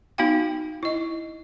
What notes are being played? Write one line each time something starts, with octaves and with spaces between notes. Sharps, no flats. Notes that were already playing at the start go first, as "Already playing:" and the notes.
B3 D#4 F#4 F5 G5
E4 D#5